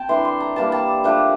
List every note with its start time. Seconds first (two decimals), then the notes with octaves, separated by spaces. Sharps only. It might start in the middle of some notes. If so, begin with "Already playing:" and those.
Already playing: C4 G5 A5
0.09 E3 A3 D4 C6
0.25 C6
0.40 A#5
0.56 E3 G3 A#3 D4 A5
0.72 A5
1.04 F3 A3 D4